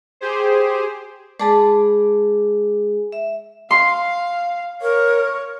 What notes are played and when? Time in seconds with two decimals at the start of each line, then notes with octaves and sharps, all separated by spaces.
0.21 G4 G#4 C5
1.39 G#3 G#4 D5 A5 B5
3.12 E5
3.71 F5 C6
4.82 A#4 C#5